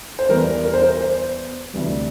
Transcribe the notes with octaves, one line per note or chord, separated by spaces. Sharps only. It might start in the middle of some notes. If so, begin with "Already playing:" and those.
C5
E2 E3 G3 A#4
A#4
C5
A#4
C5
D2 C3 E3 G3